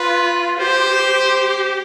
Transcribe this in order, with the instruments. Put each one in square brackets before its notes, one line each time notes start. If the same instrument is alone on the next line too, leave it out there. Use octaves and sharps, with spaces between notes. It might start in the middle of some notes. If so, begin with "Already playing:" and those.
Already playing: [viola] F4 [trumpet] B4
[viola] G4 [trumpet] C5